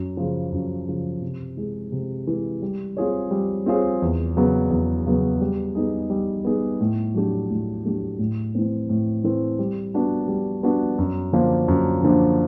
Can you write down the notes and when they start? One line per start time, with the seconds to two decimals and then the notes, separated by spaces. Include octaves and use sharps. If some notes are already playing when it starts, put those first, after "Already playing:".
Already playing: F#2
0.17 C#3 F3
0.52 F#2
0.88 C#3 F3
1.22 C3
1.57 E3 G#3
1.92 C3
2.27 E3 G#3
2.62 G3
2.97 C4 F4 G#4 C#5
3.31 G3
3.66 C4 F4 G#4 C#5
4.02 E2
4.37 C#3 F#3 B3
4.70 E2
5.06 C#3 F#3 B3
5.41 G3
5.75 B3 D#4 G#4
6.10 G3
6.45 B3 D#4 G#4
6.81 A2
7.14 F#3 A3 D4 G4
7.50 A2
7.85 F#3 A3 D4 G4
8.19 A2
8.55 E3 A3 C4
8.89 A2
9.24 E3 A3 C4
9.59 G3
9.94 B3 D4 F#4
10.28 G3
10.63 B3 D4 F#4
10.98 F#2
11.33 D3 F3 A#3 D4
11.68 F#2
12.03 D3 F3 A#3 D4